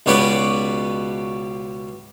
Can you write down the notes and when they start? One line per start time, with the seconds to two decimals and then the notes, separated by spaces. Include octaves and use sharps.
0.06 C#2 B2 C#4 G4 B4 D5